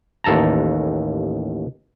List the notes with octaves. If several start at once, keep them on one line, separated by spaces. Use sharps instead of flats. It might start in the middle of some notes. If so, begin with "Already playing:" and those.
A1 D#2 A4 A5 A#5